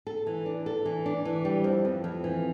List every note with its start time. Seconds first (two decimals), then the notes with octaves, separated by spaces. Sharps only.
0.07 A4
0.27 E3
0.46 D4
0.66 A4
0.85 E3
1.06 D4
1.25 E3
1.45 G3
1.64 F2
1.85 F2
2.04 F2
2.24 E3